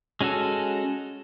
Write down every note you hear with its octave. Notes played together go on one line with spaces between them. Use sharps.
G#3 C#4 F#4 A4